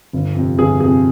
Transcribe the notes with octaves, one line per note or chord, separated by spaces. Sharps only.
G1
F2 C3
G1 G#4
F2 C3 G#4